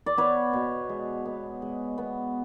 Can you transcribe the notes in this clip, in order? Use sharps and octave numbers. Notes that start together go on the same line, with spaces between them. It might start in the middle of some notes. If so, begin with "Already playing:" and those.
D5
B3 B4 C#5
B2
G#3
B3
G#3
B3